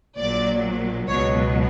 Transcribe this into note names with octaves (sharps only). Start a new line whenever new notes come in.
A#1 A#2 F#3 D5
C#2 B2 F#3 C#5